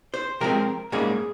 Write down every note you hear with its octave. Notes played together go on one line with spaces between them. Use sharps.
C5
C3 F3 G#3 C4 A#4
G#2 G3 A#3 C#4 G#4